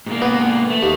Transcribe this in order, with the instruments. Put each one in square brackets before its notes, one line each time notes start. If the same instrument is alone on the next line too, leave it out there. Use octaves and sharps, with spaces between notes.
[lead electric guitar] G#2 A#3
[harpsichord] B3
[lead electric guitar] A3
[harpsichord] D#2